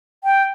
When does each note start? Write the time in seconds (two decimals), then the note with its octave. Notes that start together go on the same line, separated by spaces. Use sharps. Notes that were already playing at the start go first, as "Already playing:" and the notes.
0.24 G5